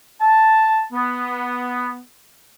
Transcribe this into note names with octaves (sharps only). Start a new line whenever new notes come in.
A5
B3